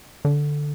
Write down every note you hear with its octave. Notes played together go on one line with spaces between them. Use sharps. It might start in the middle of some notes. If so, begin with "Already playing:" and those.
D3